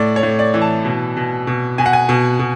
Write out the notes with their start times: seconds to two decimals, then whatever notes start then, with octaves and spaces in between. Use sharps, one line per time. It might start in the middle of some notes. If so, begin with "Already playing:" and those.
Already playing: A2 D5
0.16 C#5
0.23 A2
0.39 D5
0.54 E3
0.61 A5
0.85 B2
1.17 B2
1.47 B2
1.78 B2 G#5
1.86 F#5
1.93 G#5
2.09 B2
2.39 B2